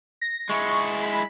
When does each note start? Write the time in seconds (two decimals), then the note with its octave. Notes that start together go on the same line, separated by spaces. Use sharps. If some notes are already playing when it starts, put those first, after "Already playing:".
0.21 A#6
0.50 G#3 E4 C#6
1.03 B5